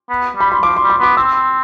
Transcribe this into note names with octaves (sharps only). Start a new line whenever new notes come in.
B3
G3 B5
C6
F3 D6
C6
G3
C6
B3 D6
C4 E6